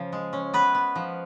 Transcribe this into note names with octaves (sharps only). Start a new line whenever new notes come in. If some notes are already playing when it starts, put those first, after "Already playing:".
Already playing: C#3 F3
G#3
C#4
B3 B4
B3
F3